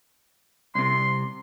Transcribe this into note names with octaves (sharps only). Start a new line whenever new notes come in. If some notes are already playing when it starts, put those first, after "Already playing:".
C2 C3 C6